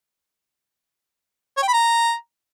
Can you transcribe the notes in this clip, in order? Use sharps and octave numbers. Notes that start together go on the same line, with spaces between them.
C#5
G5
B5
A#5